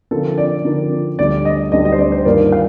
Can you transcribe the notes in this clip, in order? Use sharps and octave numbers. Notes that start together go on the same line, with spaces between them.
D3 F3 C4 F4 A4 A#4
D5
D3 F3 C4 F4 A#4
D2 D3 G3 D5
D#5
D2 D3 G3 D#5
D#5
C5
D5
C5
G2 D#3 A#3 F4 A#4 D5
F5